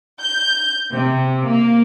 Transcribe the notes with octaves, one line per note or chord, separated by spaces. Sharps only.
G6
C3
A#3